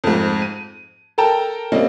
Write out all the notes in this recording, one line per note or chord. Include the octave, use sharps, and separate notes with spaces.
F2 G#2
D#7
A4 A#4 G5 A5 A#5
G3 A#3 C4 C#4 D#5